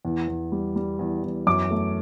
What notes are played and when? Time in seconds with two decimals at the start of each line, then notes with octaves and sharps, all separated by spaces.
0.05 E2
0.28 E2
0.52 G3
0.76 G3
0.99 E2
1.23 E2
1.47 F#2 D6
1.71 A3